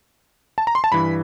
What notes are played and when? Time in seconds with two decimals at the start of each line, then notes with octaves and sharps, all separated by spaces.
0.58 A5
0.67 A#5
0.75 C6
0.84 A5
0.92 G2 E3 B5